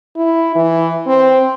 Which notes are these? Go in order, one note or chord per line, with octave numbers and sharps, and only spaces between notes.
E4
E3
C4